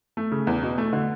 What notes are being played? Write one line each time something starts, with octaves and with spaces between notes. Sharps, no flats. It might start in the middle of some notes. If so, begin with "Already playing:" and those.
A3
C#3
E2
B2
A3
D3